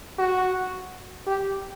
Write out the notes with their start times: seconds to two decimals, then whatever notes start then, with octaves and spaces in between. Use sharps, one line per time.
0.19 F#4
1.26 G4